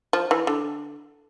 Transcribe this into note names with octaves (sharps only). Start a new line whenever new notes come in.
F3
E3
D3